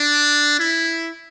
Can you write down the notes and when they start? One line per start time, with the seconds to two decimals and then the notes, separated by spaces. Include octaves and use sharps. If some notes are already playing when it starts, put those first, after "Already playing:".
Already playing: D4
0.59 E4